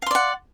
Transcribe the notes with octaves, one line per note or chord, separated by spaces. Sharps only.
D5 F5 F#5 C6